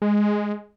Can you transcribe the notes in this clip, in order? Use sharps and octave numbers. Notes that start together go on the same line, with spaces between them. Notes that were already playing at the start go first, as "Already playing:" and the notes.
G#3